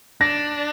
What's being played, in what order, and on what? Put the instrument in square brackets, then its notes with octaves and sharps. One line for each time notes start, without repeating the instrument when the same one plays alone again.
[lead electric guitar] D4 [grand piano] A#6